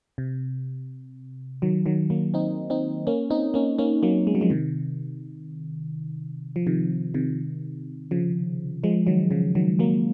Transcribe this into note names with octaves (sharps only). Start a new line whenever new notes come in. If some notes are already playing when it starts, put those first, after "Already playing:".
C3
D#3 F#3
D#3 F#3
F#3 A#3
C4 D#4
C4 D#4
A#3 C#4
C4 D#4
A#3 C#4
A#3 C#4
F#3 A#3
G#3
F#3
F3 G#3
C3 D#3
F3
C3 D#3
C3 D#3
C#3 F3
F3 G#3
D#3 F#3
C#3 F3
D#3 F#3
F#3 A#3